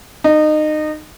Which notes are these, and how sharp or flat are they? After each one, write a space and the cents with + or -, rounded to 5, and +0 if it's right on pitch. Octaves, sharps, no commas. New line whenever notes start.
D#4 -25